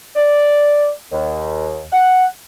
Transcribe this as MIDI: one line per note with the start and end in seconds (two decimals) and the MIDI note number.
0.16 0.91 74
1.12 1.83 39
1.92 2.25 78